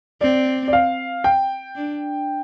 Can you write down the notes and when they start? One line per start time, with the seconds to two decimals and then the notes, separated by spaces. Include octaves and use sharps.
0.21 C4 D5
0.68 D5
0.73 F5
1.24 G5
1.75 D4